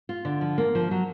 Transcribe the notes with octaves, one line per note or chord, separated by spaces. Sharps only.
F4
D3
F3
A#3
F3
F#3